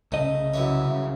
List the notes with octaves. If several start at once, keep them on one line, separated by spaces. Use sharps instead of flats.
C2 C#3 A3 D#5
F#2 E3 C#5 E5